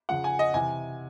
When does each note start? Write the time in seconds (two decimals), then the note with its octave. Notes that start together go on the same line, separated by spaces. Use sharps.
0.09 C#3 F3 F#5
0.24 G#5
0.39 D#5
0.54 C3 E3 G#5